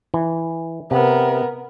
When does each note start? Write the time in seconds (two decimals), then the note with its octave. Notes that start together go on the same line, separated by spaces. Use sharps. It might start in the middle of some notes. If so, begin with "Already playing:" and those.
0.14 E3
0.91 C3 B3 A#4